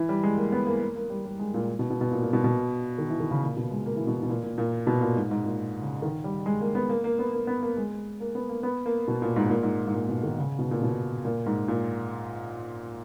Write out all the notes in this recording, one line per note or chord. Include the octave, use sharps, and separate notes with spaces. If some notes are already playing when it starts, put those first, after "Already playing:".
Already playing: E3
G3
G#3
A#3
B3
A#3
A#3
A#3
G3
G3
G#3
A#2
B2
B2
B2
A#2
A#2
B2
B2
D#3
E3
D#3
C#3
A#2
B2
G#3
A#3
E3
B2
B2
A#2
A#2
A#2
B2
A#2
G#2
G#2
A#2
C#3
D#3
G3
G#3
A#3
B3
A#3
A#3
B3
A#3
B3
A#3
G#3
A#3
B3
A#3
B3
A#3
B2
A#2
G#2
A#2
G#2
G#2
A#2
B2
D#3
C#3
B2
A#2
B2
A#2
G#2
A#2